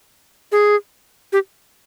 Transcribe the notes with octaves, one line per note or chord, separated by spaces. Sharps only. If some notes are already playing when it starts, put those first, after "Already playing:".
G#4
G4